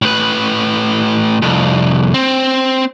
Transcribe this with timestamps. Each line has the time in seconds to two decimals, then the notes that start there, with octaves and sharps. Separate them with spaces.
0.02 A2 B4
1.42 C2 F2
2.14 C4